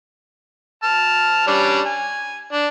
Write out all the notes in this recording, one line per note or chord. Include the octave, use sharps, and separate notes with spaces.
A5 F6
G3 C#4 D4
G#5
D4